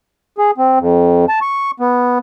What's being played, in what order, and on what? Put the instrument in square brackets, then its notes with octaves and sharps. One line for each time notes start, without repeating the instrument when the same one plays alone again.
[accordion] G#4
C4
F2
A5
C#6
B3